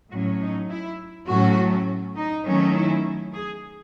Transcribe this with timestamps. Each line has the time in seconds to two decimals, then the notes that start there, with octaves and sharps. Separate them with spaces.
0.12 A2 F#3 C#4 F#4
0.41 D#4
0.69 E4
1.28 A2 F#3 A3 C#4 F#4
2.16 D#4
2.46 D#3 F#3 A3 C#4
2.74 E4
3.34 G#4